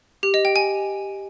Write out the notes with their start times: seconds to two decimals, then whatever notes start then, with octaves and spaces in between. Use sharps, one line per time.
0.23 G4
0.34 D#5
0.45 G5
0.56 G#5